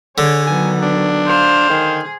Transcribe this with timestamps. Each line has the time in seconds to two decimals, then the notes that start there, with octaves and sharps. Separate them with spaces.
0.18 D3 G#4 C#5 G#5
0.47 D#3 F#3 B3 G#5
0.82 D4
1.27 C5 F5
1.70 D#3 G#4